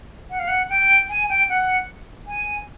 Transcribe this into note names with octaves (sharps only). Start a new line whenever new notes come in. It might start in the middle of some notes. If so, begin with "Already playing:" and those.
F#5
F5
F#5
G5
G#5
G5
F#5
G#5